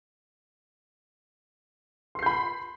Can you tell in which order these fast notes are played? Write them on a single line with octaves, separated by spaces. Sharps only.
C6 C7 G6 B5